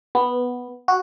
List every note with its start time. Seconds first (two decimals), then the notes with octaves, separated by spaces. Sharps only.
0.15 B3
0.88 F#4